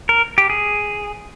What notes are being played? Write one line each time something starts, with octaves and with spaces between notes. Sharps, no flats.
A#4
G4
G#4